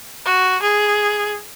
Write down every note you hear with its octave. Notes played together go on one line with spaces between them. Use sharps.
F#4
G#4